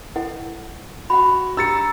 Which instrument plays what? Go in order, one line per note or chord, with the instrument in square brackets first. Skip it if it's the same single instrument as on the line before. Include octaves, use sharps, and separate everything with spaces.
[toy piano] E4 A4 F#5
[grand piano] F#4 [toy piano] F#5 B5
[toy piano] D4 G4 [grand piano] A#5 [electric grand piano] E6 A6 C#7